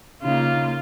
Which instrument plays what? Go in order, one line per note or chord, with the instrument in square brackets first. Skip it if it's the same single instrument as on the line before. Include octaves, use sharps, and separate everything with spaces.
[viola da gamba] C#3 D#4 [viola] A#3 F4